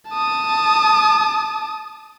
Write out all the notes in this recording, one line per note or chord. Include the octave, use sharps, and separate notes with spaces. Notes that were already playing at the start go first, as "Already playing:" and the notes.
A5 D#6